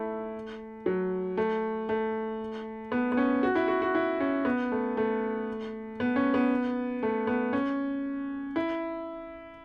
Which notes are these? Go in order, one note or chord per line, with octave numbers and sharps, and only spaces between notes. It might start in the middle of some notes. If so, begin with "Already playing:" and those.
Already playing: A3 E4
F#3
A3
A3
B3
B3
C#4
F#4
E4
F#4
F#4
E4
C#4
B3
A3
A3
B3
C#4
B3
A3
B3
C#4
E4